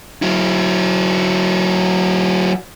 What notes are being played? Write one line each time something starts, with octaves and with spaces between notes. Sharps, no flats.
F#3 E4